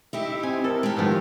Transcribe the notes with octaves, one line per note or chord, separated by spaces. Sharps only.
D#4 E4 G4 E5
C4 G#5
A4 A#4
G#3 G4
A2 D#3 F3 B3